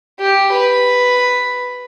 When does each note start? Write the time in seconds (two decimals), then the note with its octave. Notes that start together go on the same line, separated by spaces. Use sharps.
0.20 G4
0.52 B4